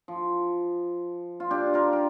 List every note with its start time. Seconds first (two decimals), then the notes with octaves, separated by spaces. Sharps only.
0.08 F3
1.40 F4
1.51 D4 G4
1.74 F4 A#4
1.93 A#4